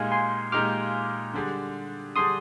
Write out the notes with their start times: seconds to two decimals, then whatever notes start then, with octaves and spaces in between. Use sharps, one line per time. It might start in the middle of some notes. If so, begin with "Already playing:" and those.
Already playing: A#2 G#3 D#4 G4 F5 G#5
0.12 G#5 C6
0.52 A#2 G#3 D#4 G4 D6 F6
1.33 D3 G3 D4 G#4
2.16 D3 G3 D4 G#4 C6 D#6